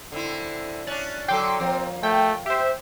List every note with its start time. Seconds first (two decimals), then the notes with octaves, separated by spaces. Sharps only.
0.12 D3 C4 E4
0.87 C#4 D4 F#6 A6
1.28 D3 F#3 A4 G5 C6 D6
1.60 F3 A#3 C4
2.03 A3 G5
2.46 G4 C5 E5